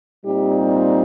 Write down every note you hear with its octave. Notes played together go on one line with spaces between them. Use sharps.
A#2 G3 C4 D#4 G4